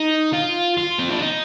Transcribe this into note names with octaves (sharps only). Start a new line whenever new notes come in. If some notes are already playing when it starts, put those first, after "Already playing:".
Already playing: D#4
F4
F4
C4
D4
D#4